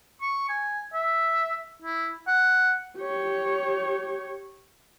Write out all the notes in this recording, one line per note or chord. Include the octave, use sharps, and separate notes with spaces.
C#6
G#5
E5
E4
F#5
G4 C#5